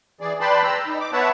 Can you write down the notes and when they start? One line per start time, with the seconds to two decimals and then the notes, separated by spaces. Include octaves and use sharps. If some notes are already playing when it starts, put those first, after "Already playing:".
0.21 E3 G#4 D5
0.41 B4 D5 G5 A5 B5 C6
0.64 A#5 E6
0.87 D#4
1.01 D6
1.13 B3 B4 C#5 E5 F#5 A5